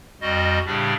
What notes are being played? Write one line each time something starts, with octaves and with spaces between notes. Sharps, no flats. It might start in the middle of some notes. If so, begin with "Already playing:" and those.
F2 G3 F#4 D#5
A2 C#3 G3 D4 G4